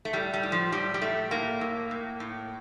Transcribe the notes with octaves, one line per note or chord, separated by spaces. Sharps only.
A3
A2 G3
G3
A2
F3
A2 G3
G3
A2 A3
A2 A#3
A2
A2
A2